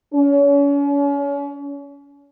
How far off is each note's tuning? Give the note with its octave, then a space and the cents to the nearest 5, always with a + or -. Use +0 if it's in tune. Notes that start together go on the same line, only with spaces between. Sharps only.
C#4 +35